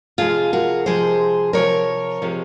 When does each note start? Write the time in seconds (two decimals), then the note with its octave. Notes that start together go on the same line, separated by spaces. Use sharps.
0.18 C3 F3 G#3 F4 G#4
0.53 F#4 A#4
0.86 C3 F3 G#3 G#4 C5
1.53 C3 F3 G#3 A#4 C#5
2.22 C3 F3 G#3